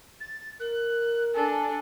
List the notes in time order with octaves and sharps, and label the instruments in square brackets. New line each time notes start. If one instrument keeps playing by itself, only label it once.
[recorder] A6
[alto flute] A#4 [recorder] F#6
[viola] D4 A4 [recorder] G#5